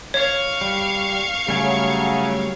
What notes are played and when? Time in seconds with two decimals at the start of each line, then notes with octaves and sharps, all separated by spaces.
0.14 C#5 F5 C#6
0.61 G3
1.48 C#3 F#3 G3 A3 G#5